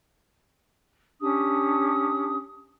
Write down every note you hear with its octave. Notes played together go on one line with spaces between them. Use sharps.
C#4 D4 G4 D#6